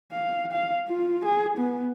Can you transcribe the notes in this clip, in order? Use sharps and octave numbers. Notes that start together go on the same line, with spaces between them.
F5
F5
F4
G#4
B3